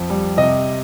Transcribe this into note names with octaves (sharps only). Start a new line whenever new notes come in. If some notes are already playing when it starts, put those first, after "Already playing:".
Already playing: F2
G3
C3 D#5